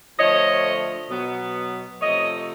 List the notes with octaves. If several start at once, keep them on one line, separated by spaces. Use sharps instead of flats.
D3 F3 A3 C#5 D#5
B2 F#3 B3
C3 F3 A3 C#5 D#5